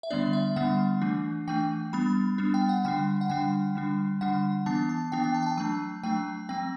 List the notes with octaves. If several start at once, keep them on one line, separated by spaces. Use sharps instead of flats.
E5
D3 G3 B3 D4 D5
E5
D3 G3 B3 D4 F#5
E3 A3 D4
E3 A3 D4 G5
G3 B3 D4 B5
G3 B3 D4
G5
F#5
D3 G3 D4 G5
F#5
D3 G3 D4 G5
D3 G3 D4
D3 G3 D4 F#5
E3 B3 D4 A5
A5
E3 B3 D4 G5
G5
A5
G5
A5
F#3 A3 D4 A5
F#3 A3 D4 G5
F#3 C4 G5